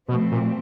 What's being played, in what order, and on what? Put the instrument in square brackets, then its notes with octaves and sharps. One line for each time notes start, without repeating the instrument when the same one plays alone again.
[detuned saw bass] B2 [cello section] F3 A3 C4
[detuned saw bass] A#2